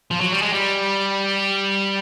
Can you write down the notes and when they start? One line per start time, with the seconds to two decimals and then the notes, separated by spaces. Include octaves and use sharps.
0.11 F3
0.21 F#3
0.32 G3
0.42 G#3
0.53 G3